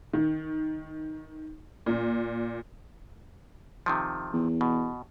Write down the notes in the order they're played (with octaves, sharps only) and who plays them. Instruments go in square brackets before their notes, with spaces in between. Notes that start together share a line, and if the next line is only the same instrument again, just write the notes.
[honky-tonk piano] D#3
A#2
[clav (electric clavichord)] C3 D#3 F3
[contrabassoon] E2
[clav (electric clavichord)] B2